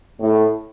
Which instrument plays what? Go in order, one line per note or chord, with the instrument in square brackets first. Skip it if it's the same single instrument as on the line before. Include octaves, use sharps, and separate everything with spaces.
[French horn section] A2